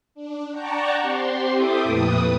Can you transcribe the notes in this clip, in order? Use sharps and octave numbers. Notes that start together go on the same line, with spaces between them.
D4
D5 F#5 G5 A5 A#5 C#6
C4 G4 C6
E4 A4 E5 G5 D6 D#6
F2 A#2 A3 B4 D#6